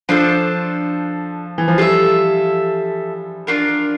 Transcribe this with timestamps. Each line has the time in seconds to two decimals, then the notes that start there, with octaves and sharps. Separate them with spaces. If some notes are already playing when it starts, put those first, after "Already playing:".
0.09 F3 D4 F4 A4 C5
1.58 E3
1.68 F3
1.78 G3 F4 A4 E5
3.47 D4 F4 A#4